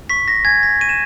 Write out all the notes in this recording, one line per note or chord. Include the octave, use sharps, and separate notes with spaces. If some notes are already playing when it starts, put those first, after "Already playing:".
C#6 B6
A#6
G#5 G#6
A#6
C#6 D#7
E7